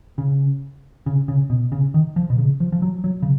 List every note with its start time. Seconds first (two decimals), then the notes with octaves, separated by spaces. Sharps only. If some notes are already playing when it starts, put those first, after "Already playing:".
0.18 C#3
1.06 C#3
1.28 C#3
1.50 B2
1.72 C#3
1.94 D#3
2.16 F3
2.30 B2
2.38 C#3
2.60 F3
2.72 F3
2.82 F#3
3.04 F#3
3.22 C#3